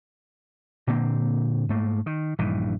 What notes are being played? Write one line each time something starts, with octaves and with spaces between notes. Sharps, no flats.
A#2 D3 A#3 C4
G#2 A3 A#3
D#3
A#1 G2 D#3 E3